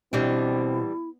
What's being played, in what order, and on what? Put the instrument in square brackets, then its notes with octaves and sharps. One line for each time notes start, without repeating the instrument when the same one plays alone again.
[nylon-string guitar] B2 [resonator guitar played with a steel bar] E3 G3 D4 [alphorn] C4 [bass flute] E4